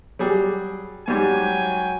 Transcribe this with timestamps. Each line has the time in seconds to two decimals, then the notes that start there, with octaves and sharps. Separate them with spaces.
0.19 F#3 G3 G#4
1.08 G#2 F#3 G3 G5 G#5